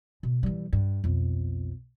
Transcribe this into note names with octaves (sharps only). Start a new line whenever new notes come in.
B2
E3 G3
G2
B1 F2